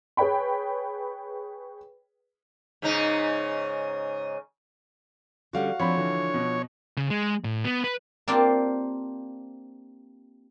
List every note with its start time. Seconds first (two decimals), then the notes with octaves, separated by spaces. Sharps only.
0.17 G#4 B4 C#5 G5 B5
2.82 G#2 C#3 D#4
5.53 D3 G3 C#4 F#4 F5 F#5
5.80 F3 C4 D4 C#5 B5
5.97 D3 E3
6.34 B2
6.97 C#3
7.10 G#3
7.44 A2
7.64 B3
7.84 B4
8.28 A#3 C4 D4 F4 G4 C5